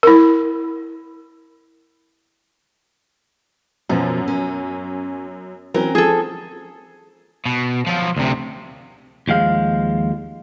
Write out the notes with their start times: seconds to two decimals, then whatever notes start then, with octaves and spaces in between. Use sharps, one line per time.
0.03 E4 A#4
3.89 F#2 B2 F3 C#4
4.28 C#4
5.74 E3 F#3 C4 C#4 A#4
5.95 F3 G#4 A4
7.46 B2
7.87 F3 F#3
8.17 D2 C3
9.28 D#2 F3 G#3 F5